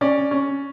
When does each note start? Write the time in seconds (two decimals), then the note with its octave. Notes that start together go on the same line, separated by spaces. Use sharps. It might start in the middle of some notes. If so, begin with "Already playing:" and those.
0.01 C#4 D5
0.31 C#4